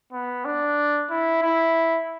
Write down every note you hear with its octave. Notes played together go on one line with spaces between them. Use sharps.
B3
D4
E4
E4